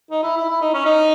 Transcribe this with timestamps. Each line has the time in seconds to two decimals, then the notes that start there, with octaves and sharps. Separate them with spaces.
0.11 D#4
0.23 E4
0.36 E4
0.49 E4
0.61 D#4
0.74 C#4
0.85 D#4